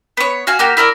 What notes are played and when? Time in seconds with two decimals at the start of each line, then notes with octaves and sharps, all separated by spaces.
0.17 B3 C#5
0.47 F#4 F5 G#5
0.59 A#3 F#4 G4
0.77 E4 A#4 C5 D5